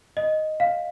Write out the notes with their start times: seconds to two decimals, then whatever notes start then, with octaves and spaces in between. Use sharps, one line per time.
0.17 D#5
0.60 F5